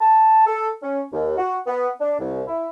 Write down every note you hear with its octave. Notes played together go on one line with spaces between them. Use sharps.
A5
A4
C#4
D#2
F#4
B3
D4
C2
E4